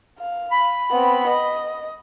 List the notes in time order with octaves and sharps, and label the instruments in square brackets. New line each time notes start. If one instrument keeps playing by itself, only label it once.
[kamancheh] F5
[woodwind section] B5
[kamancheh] B3 C4
D#5